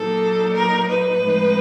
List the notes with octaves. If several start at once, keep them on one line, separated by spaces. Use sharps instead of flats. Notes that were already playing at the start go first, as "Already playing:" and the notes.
Already playing: A#2 F#3 A#3 D#4 A4
A#4
B4
A2 F3 G#3 C4 D#4